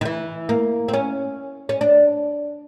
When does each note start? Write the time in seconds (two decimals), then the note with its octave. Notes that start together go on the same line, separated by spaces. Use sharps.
0.01 D#3
0.05 E3
0.49 A#3
0.88 C4
0.93 C#4
1.69 C#4
1.81 D4